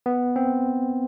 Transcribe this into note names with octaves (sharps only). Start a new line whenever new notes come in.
B3
C4